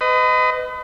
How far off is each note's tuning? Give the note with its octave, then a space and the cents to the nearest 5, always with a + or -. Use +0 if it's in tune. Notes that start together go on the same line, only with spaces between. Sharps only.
B4 +40 D#5 +0